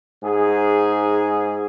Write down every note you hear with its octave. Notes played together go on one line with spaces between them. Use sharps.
G#2 G#4